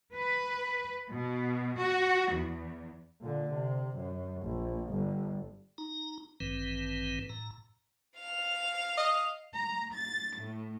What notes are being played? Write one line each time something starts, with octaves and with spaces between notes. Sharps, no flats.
B4
B2
F#4
E2
A#2 D3
C3
F#2
A#1
G1
D#4 A#5
A1 G2 D#3 E3 C4 B4
A2 A#5
F5 F7
D#5
A#5
A6
A2